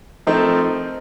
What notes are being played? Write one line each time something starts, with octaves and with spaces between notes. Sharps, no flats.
F3 A3 C4 D#4 A#4